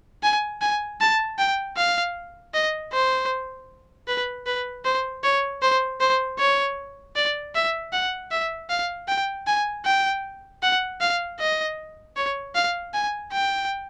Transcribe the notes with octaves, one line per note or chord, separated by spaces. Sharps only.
G#5
G#5
A5
G5
F5
D#5
C5
B4
B4
C5
C#5
C5
C5
C#5
D5
E5
F#5
E5
F5
G5
G#5
G5
F#5
F5
D#5
C#5
F5
G#5
G5